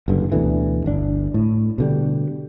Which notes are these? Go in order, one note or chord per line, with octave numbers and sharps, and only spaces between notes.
F#1 G2 D3
D2 B2 D3 E3
G1 D4
A2
B2 D3 G3